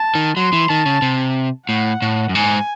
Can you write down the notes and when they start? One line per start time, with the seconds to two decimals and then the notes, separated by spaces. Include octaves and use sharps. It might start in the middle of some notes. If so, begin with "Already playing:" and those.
Already playing: A5
0.15 D#3
0.37 F#3 C6
0.53 E3
0.69 D#3 A5
0.86 C#3
1.02 C3
1.68 A2 F#5
2.02 A2
2.29 F#2
2.35 G#2 G#5